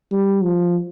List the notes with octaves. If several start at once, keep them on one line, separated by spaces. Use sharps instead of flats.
G3
F3